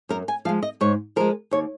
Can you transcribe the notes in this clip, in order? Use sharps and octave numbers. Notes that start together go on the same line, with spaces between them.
F#2 A#4
G#5
F3 G#3 F5
D#5
G#2 C#5
F3 G#3 A#4
D#2 C#5